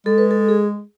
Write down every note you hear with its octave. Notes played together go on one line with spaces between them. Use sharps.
G#3 A4
B4
A4
G#4